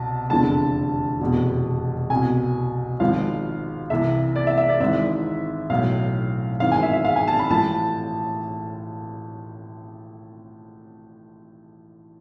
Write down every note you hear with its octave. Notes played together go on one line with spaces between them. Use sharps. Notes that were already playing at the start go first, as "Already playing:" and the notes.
Already playing: C2 B2 A5
F1 E2 D3 F3 A5
F1 E2 B2
C2 G#5
B2
G#1 G#2 F3 F5
C2 C3 E3 E5
D5
E5
E5
D5
G#1 G#2 E3 E5
B1 A2 E3 F5
G#1 G#2 E3 F5
G#5
E5
E5
F5
G#5
A5
B5
A1 A2 F3 A5